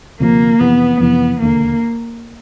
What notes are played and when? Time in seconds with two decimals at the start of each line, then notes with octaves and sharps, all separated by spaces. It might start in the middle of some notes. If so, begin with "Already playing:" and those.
0.20 D2 C3 F3 A#3
0.60 F2 C3 E3 B3
1.00 F2 C3 E3 B3
1.40 E1 D#2 D3 A#3